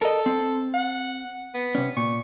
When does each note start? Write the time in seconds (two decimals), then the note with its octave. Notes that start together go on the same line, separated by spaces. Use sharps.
0.02 A4 A#4 D#5
0.26 C4
0.74 F#5
1.54 B3
1.75 C3 C#4
1.97 A#2 C#6